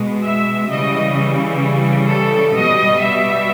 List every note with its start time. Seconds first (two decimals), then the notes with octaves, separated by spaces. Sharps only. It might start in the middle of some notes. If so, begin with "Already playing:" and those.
Already playing: B2 G#3
0.24 E5
0.71 C#3 E3 G3 D#5
2.10 A4
2.57 B2 G3 D#5
3.03 E5